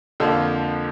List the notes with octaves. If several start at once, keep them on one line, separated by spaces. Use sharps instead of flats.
F2 D3 F3 A#3